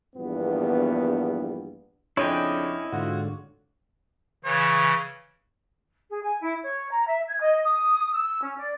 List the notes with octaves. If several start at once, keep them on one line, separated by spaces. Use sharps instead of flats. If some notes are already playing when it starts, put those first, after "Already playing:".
A#1 E2 G2 B3
F2 C#3 C#4 D4 E4 C#5 D#5 G5
G#2 D3 C4 F4 F#4
C#3 E3 C#5
G#4
G#5
E4
C#5
A#5
E5
G#6
D#5
D#6
E6
C#4
D5